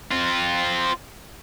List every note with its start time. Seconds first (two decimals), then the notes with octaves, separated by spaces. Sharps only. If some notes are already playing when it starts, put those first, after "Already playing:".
0.11 C4 F4